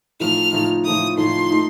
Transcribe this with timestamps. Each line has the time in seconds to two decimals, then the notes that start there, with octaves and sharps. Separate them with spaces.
0.20 A2 F3 A3 D#4 F6
0.53 A2 F3 A3 D#4
0.85 A2 F3 A3 D#4 D#6
1.18 A2 F3 A3 D#4 C6
1.51 A3 D#4